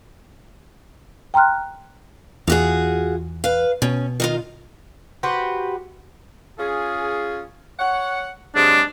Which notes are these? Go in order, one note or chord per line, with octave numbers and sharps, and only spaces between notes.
G5 A#5 C6 F6 F#6
E2 F4 F#4 G#4
B4 F5
B2 C#4
D#3 D#4 F4
F#4 G4 B4 C5
C#4 F4 G#4
C#5 F#5
C3 F#3 G#3 D4